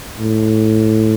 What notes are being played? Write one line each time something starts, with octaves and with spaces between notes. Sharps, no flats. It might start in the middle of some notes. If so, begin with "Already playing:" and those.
A2